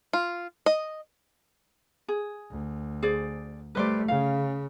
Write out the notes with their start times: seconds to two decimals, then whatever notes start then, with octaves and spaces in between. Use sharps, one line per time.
0.13 F4
0.66 D#5
2.08 G#4
2.50 D2
3.03 G#4 C5 D5
3.75 G3 A3 B4 C5 D5
4.08 C#3 F5